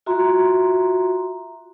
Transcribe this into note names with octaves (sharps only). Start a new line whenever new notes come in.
F4 F#4 E5 A#5 C6